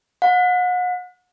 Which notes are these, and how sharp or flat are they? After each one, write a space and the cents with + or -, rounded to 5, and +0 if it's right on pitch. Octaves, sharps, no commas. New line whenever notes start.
F#5 -35